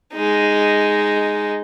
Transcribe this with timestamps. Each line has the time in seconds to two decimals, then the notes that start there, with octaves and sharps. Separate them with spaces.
0.14 G#3 D#4